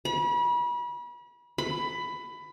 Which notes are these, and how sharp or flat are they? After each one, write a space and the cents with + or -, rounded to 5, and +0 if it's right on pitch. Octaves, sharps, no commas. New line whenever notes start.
B5 -35
B5 +15